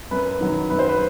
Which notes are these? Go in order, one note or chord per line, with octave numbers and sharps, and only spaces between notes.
F#2 B4
D#3 F#3
F#2 B4
C5
B4